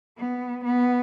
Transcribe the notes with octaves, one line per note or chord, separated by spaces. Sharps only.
B3
B3